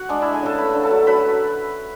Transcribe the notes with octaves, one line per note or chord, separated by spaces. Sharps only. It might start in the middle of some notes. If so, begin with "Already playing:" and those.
Already playing: F#4 F#5
G#3 D4 D5
G#3 E4 E5
G#4 G#5
C#3 A4 A5
A3 B4 B5
D3
A4 A5
F#3
F#3 B4 B5